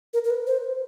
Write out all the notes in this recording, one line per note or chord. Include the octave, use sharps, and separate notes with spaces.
A#4
A#4
B4
C5